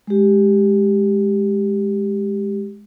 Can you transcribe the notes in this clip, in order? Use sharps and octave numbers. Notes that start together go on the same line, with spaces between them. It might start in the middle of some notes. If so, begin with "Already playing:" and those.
G#3 G4